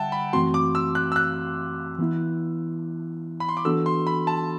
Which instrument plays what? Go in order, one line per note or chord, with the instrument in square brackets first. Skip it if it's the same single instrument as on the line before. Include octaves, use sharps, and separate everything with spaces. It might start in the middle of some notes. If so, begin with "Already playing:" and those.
Already playing: [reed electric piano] D3 G3 [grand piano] E5 F#5 G5 A5
[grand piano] B5
[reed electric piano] F#2 E3 A3 C4 F#4 [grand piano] C6
[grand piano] D6
E6
F#6
E6
F#6
[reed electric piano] E3 B3 E4
[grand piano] B5
C6
D6
[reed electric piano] E3 B3 D4 F#4 A4 [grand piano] E6
[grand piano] C6
B5
A5